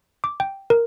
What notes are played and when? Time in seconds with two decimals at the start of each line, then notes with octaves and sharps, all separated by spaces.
0.24 D6
0.40 G5
0.70 A#4